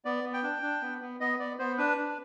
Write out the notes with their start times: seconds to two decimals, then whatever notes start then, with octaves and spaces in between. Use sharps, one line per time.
0.05 B3 D5
0.24 B3
0.33 G5
0.43 D4
0.62 D4
0.82 B3
1.01 B3
1.20 B3 D#5
1.39 B3 D5
1.59 B3 C5
1.78 D4 B4
1.98 D4